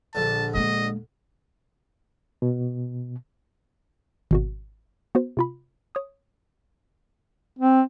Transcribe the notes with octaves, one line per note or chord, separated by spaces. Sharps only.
A#1 D3 A5
G#3 A#3 D#5
B2
G#1 B2 F#4
B3 F#4 C5
C3 F4 B5
C#5 D#6
C4